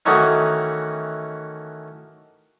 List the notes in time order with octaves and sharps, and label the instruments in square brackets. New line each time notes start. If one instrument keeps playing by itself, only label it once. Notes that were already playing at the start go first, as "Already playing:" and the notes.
[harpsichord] D#3 E3 A3 C#4 D#4 F#4